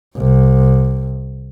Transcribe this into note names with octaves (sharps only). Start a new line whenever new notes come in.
C2